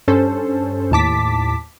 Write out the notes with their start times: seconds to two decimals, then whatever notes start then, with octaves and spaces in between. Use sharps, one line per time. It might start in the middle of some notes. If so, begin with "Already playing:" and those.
0.08 G2 C#4 A4 C5
0.91 D#2 A2 A5 D6 B6